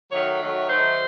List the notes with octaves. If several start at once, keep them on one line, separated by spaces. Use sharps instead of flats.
D#3 F#3 A3 C#5
D#3 F#3 A3
D#3 F#3 A3 C5